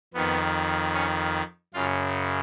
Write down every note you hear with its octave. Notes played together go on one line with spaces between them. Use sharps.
F2 D#3 B3
C#4
F#2 C#3 F4